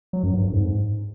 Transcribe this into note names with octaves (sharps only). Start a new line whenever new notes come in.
F#3
F#2
G2
F2
G#2